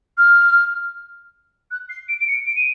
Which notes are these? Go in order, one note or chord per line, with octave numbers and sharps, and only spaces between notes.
F6
F#6
C7
D7
D7
C#7
D7
D#7